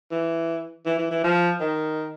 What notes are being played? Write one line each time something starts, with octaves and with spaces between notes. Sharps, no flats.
E3
E3
E3
E3
F3
D#3